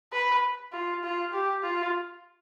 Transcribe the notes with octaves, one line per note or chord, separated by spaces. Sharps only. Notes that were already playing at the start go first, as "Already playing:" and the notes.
B4
F4
F4
G4
F4